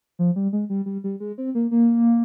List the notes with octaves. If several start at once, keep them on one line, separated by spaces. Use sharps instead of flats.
F3
G3
G#3
G3
G3
G3
G#3
C4
A#3
A#3